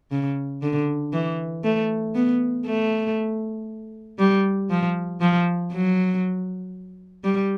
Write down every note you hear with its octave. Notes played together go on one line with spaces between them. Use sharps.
C#3
D3
E3
A3
B3
A3
G3
F3
F3
F#3
G3